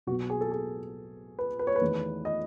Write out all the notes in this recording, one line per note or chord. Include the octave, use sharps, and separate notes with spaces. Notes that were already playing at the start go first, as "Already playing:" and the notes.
B1 B2 F#3 B3 F#4
G#4
A4
G#4
B4
B4
C#5
B4
E2 D#3 A3 D#4
D#5